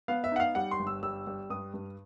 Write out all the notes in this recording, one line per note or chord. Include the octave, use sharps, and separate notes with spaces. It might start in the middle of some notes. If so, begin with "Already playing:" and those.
B3 F5
E5
D#4 F#5
F5
G3 F#5
C6
G1
E6
G3 E6
G3
G2 D#6
G2